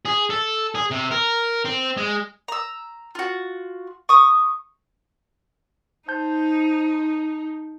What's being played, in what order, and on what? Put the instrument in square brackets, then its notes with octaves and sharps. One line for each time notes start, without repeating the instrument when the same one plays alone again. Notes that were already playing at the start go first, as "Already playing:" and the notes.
[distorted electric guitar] G#4
A4
G#4
C3
A#4
C4
G#3
[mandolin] A#5 E6
F4 F#4
C#6 D#6
[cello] D#4 [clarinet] C5 [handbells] A5 G6